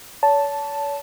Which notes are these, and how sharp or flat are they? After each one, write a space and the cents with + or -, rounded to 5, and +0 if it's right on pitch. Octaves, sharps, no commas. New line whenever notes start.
C#5 +40 A5 +0